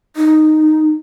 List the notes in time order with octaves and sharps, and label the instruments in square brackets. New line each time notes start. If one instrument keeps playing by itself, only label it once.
[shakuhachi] D#4